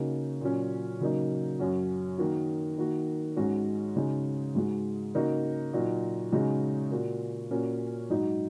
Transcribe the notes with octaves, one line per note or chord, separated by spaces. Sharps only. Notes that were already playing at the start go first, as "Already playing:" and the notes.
Already playing: C#3 A#3 D#4 F#4
A#2 F#3 C#4
C#3 F#3 A#3 D#4
F#2 F#3 C#4 F#4
D#3 A#3 F#4
D#3 A#3 F#4
G#2 G#3 C#4 F#4
C#3 G#3 D#4 F#4
G#2 G#3 F#4
C#3 A#3 D#4 F#4
A#2 F#3 D#4 F#4
C#3 G#3 D#4 F#4
A#2 A#3 F#4
A#2 A#3 C#4 F#4
G#2 F#3 D#4 F#4